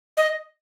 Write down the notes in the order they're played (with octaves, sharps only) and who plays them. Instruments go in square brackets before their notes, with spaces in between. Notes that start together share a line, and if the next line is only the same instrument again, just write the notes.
[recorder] D#5